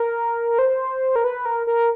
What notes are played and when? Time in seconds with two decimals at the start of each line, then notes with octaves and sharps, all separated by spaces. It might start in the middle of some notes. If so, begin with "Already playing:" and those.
Already playing: A#4
0.59 C5
1.16 A#4
1.24 B4
1.45 A#4
1.67 A#4